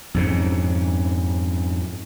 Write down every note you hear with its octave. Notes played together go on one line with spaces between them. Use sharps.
F2 G#2 C#3